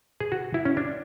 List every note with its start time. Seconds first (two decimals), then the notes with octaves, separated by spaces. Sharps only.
0.20 G#4
0.32 F#4
0.54 E4
0.65 C#4
0.77 D4